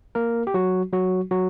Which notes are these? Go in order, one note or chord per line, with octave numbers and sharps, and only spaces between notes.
A#3 A#4
G4
F#3 F#4
F#3 F#4
F#3 F#4